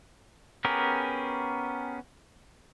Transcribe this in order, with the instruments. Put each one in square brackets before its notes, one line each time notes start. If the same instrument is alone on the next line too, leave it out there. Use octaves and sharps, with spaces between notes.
[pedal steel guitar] B3 C#4 G4 G#4 A#4